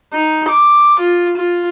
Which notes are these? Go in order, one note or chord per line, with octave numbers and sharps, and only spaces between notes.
D#4
D6
F4
F4